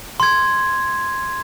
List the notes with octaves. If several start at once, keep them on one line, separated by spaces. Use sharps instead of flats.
C6 G#6